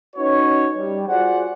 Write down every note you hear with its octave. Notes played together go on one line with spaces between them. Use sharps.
C#4 D#4 F#4 B4 C#5
G3
F4 F#4 G#4 C5 D5 F#5